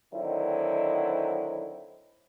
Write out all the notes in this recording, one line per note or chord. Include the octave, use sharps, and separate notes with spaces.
D3 D#3 F#3 C4 D#4 E4